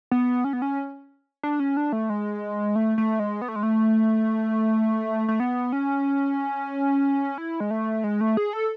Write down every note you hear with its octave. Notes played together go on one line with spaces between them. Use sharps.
B3
C#4
B3
C#4
D4
C#4
D4
A3
G#3
A3
A3
G#3
B3
A3
G#3
A3
A3
B3
C#4
E4
G#3
A3
G#3
A3
G#4
A4